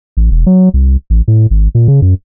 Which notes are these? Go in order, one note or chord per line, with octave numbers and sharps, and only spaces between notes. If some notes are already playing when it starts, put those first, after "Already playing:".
A1
E1
F#3
C2
A1
A2
G#1
A#2
C#3
F#2